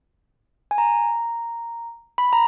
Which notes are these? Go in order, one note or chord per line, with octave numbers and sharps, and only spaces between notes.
G#5
A#5
B5
A#5